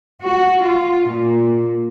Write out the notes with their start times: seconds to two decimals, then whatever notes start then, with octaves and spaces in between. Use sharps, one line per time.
0.23 F#4
0.63 F4
1.07 A#2